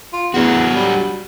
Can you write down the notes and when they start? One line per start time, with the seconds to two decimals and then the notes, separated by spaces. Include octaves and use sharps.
0.13 F4
0.34 E2 F#3 D4 F#4
0.74 G3